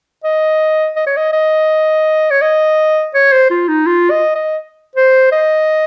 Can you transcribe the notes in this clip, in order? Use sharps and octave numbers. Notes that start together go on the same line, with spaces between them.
D#5
D#5
C#5
D#5
D#5
C#5
D#5
C#5
C5
F4
D#4
F4
D#5
D#5
C5
D#5